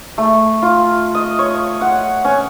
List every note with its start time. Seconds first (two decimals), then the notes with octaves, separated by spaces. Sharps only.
0.18 A3
0.62 F4
1.15 D#5
1.39 C#5
1.81 F#5
2.25 C#4